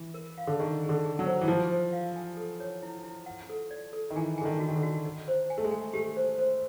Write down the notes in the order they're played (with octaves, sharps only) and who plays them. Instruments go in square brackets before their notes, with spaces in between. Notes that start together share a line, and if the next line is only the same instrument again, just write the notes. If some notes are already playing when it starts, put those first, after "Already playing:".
Already playing: [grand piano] E3
[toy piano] A#4
F5
[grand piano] D3
[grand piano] D#3 [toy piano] G#4
[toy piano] G#4
[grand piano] D3
[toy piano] G#4
[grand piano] F#3
[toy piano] C5
[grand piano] E3
[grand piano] F3 [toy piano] C5
[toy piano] C5
F5
G#5
A4
C#5
E4
E4
F#5
A4
D5
A4
[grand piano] D#3
[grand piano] E3 [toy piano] G#5
[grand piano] D3 [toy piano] G#5
[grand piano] D#3
[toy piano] F#4
[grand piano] D#3
D3
[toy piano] F#4
D#5
C5
G#5
[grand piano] A3
G#3
[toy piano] G#5
[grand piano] A3 [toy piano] G4
[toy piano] C5
C5